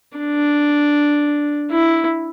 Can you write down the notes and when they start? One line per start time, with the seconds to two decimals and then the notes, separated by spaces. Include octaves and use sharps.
0.18 D4
1.71 E4